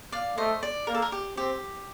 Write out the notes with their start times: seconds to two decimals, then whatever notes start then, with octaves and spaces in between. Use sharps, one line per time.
0.12 D5 F5
0.37 A3 C5 D#5
0.63 D5
0.87 A#3 A#4
0.95 A4
1.02 A#4
1.12 G4
1.37 C4 G4